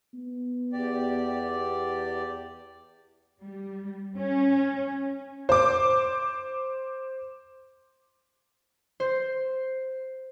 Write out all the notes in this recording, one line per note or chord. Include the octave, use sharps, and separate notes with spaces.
B3
E2 G4 D5
G3
C#4
C5 D6
C5